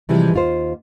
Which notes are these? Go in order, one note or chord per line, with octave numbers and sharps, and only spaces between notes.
C3 E3 F3 G3 G#3
D#2 F4 C5